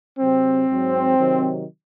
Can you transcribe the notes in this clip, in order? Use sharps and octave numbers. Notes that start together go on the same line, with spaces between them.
C3 F#3 C4
G#2 F#3
C3 D#3 F#3